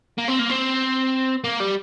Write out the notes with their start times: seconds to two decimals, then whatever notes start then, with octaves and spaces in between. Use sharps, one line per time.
0.18 A#3
0.28 C4
0.39 A#3
0.49 C4
1.44 A#3
1.60 G3